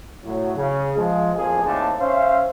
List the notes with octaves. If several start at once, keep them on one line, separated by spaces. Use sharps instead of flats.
A2 F#3
C#3
F3 G#3
A1 F2 F3 A#3 G#4
D#2 A2 C4 D5 A5
C#4 C5 E5 F5